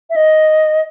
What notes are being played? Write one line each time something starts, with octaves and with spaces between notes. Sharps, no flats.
E5
D#5